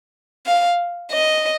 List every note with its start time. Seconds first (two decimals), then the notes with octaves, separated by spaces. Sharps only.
0.46 F5
1.11 D#5